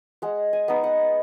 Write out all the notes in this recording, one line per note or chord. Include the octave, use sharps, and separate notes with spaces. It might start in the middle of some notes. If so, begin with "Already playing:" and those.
G#3 F#5
G#5
B3 D#4
F#5